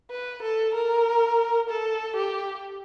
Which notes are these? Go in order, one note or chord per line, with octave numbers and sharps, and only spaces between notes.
B4
A4
A#4
A4
G4